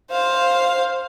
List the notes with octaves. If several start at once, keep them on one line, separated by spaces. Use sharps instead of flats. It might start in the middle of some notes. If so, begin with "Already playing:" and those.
C5 F5